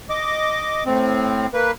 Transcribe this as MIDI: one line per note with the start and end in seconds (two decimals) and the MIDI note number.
0.10 0.84 75
0.10 0.84 86
0.86 1.47 45
0.86 1.47 60
1.54 1.71 58
1.54 1.71 71